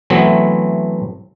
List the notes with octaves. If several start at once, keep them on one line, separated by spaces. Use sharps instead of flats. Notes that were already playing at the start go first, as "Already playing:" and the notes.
E3 F#3 A3 B3 C4